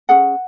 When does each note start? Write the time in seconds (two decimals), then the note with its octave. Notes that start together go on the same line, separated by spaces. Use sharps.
0.09 C#4 G#4 F#5